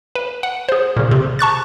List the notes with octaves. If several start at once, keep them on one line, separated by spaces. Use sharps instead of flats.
B4
F#5
G#4 C5
A#2 C#3
C3
A5 C#6 F#6 A6